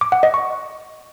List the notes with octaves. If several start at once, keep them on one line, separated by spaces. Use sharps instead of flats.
D6
F#5
D#5
C#6